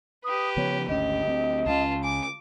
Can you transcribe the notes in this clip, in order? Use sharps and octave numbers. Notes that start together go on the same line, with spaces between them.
G4 B4 D#6
C#3 F3 B3 C#5
G#1 D2 C#4 G4 D#5
D2 G3 C4
C#2 C#3 C#4 F4 A5
G#5 D6